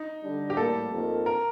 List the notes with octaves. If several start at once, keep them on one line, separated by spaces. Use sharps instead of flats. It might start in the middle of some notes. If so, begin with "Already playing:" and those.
Already playing: D#4
D3 G3 D4
G4
A2 G3 A#3 A4
F2 D#3 A#3
A#4